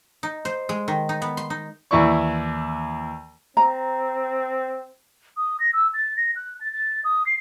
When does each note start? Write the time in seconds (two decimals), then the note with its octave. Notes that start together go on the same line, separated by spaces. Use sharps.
0.23 D#4
0.45 C5
0.69 G#3
0.88 D#3
1.09 D#4
1.22 B3
1.37 C6
1.50 D#4
1.91 D#2 E3 E4 D5 C#6
3.57 C4 A#5
5.37 D#6
5.60 A#6
5.73 E6
5.94 A6
6.17 A#6
6.36 F#6
6.61 A6
6.72 A6
7.04 D#6
7.26 C7